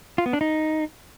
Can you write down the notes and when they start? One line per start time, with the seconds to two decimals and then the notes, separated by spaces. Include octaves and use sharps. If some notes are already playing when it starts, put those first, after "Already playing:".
0.18 F4
0.26 B3
0.33 D4
0.41 D#4